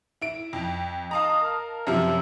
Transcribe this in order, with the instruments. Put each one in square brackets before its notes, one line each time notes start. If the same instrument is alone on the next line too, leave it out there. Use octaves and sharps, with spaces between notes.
[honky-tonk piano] E4 D7
F2
[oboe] D#5 [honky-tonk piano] F5 A5 A#5
[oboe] A#4
[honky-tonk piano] F#2 C3 F3 [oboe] E5